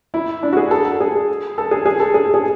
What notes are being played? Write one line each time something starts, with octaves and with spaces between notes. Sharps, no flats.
E4
D4
F#4
G#4
A4
A4
G#4
A4
G#4
G#4
A4
G#4
G#4